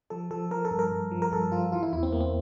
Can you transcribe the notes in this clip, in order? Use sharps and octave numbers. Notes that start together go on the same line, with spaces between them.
F3 A4
F3 A4
F3 A#4
A4
G2
A#4
G2
F3
A#4
G2 A4
F3 F4
E3 F4
E4
E2 E4
C4
E2 A#3
C4